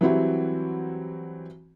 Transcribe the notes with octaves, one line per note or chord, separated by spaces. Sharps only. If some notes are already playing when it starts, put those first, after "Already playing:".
E3 F#3 G3 C4 E4 F#4